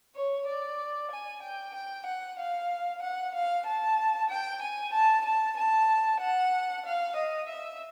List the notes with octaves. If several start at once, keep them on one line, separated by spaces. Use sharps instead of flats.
C#5
D5
G#5
G5
G5
F#5
F5
F#5
F5
A5
G5
G#5
A5
A5
A5
F#5
F5
D#5
E5